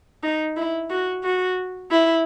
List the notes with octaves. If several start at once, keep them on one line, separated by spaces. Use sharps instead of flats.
D#4
E4
F#4
F#4
E4